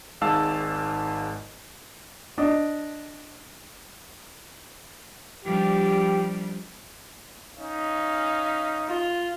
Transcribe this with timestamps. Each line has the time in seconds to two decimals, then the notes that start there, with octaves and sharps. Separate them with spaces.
0.21 G#1 G#2 F5 A5 E6
2.38 D4 D#5
5.45 F3 G3 D4 G4
7.57 C#4 D#4 F5
8.88 F4